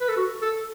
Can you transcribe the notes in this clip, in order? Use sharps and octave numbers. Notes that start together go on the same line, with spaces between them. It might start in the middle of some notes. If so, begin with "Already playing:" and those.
B4
A4
F#4
A4